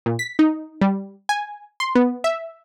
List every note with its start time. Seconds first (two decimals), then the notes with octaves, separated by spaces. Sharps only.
0.06 A#2
0.19 B6
0.39 D#4
0.81 G3
1.29 G#5
1.80 C6
1.95 B3
2.24 E5